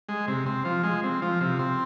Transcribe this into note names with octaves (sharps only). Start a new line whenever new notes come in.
G#3
C3
C4
F3
G#3
C4
F3
C3
C4